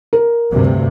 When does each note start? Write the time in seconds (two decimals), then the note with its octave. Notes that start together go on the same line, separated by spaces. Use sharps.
0.13 A#4
0.50 D2 G2 C3